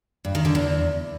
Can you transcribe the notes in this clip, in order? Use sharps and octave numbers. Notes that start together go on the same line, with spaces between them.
G2
D#3
D3
E2